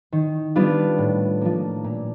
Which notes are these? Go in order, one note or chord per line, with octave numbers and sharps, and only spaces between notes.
D#3
G3 B3 D4 F4
A2
F3 A#3
A#2